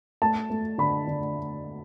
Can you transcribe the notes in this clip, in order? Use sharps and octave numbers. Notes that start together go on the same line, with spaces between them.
A3 A5
A3
D3 B5
D3